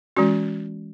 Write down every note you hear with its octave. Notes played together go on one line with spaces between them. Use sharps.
E3 G#3 C#4 F#4